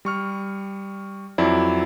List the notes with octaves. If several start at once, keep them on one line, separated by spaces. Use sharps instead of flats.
G3 C#6 F6
F2 F#3 E4 D5